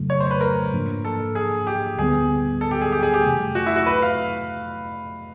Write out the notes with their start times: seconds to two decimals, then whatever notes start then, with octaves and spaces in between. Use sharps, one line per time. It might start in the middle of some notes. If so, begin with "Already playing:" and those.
Already playing: F2 C#3 F#3 A3
0.10 C#5
0.20 C5
0.31 B4
0.41 A#4
0.72 G#2 F3 A#3 D4
1.05 A4
1.35 G#4
1.67 G4
1.98 D2 D3 G3 B3 G#4
2.61 A4
2.71 G4
2.81 G#4
2.92 G4
3.03 G#4
3.14 G4
3.23 F2 C3 E3 A3
3.55 F#4
3.66 E4
3.76 F#4
3.86 B4
4.02 F5